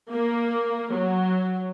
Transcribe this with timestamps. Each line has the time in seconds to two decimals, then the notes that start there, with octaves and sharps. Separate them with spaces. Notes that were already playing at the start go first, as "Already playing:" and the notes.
0.11 A#3
0.95 F#3